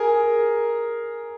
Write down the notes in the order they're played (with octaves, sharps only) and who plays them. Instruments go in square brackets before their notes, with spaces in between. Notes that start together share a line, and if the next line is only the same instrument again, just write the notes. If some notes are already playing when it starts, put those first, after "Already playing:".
Already playing: [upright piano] G#4 A#4